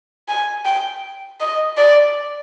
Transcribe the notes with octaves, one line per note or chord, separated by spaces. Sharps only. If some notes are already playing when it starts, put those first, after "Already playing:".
G#5
G5
D#5
D5